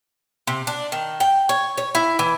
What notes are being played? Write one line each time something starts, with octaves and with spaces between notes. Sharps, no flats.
C3
D4
D#3
G5
C#5
C#5
E4
E3